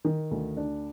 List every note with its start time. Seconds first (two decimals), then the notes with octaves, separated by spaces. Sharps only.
0.05 D#3
0.31 D2
0.57 D4